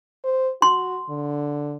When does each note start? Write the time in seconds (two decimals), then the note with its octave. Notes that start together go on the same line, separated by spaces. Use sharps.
0.24 C5
0.62 F#4 C6
1.09 D3